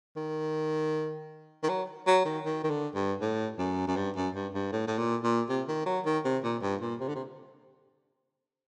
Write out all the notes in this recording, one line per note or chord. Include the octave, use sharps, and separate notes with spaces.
D#3
D#3
F#3
F#3
D#3
D#3
D#3
D3
G2
A2
F#2
F#2
G2
F#2
G2
G2
A2
A2
A#2
A#2
C3
D#3
F#3
D#3
C3
A#2
G2
A#2
C3
D3
C3